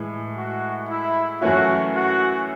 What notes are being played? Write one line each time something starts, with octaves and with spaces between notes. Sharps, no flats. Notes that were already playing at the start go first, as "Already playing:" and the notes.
Already playing: A2 E3 G#3
F#4
E4
F#2 E3 A3 C#4 E4 F#4
F#4